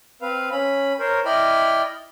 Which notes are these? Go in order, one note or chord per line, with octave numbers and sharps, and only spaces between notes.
C4 B4 F5
C#4 B5
A#4 C5 C#5
E4 D5 D#5 G5 B5 F6